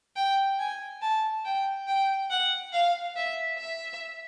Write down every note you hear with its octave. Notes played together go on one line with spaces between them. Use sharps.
G5
G#5
A5
G5
G5
F#5
F5
E5
E5